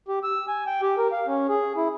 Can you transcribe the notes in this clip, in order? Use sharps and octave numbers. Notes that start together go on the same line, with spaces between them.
G4
E6
G#5
G5
G4
A#4
F5
C#4
G#4
E4